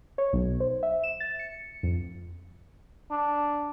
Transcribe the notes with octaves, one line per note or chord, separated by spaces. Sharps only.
C#5
B1
C5
E5
E7
A6
C#7
F2
D4